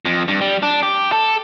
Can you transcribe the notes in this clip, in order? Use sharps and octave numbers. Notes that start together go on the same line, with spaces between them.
F2
G2
G3
D4
G4
A4